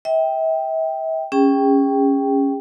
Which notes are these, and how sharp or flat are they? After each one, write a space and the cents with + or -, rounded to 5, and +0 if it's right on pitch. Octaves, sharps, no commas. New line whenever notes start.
E5 -40 G5 +0
C#4 +0 G#4 -35 G5 -5